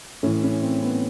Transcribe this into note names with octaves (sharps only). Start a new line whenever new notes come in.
A2 E3 C#4
C#4
C4
B3